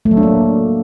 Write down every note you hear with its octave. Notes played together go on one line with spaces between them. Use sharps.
A3
F#3
D4
A#3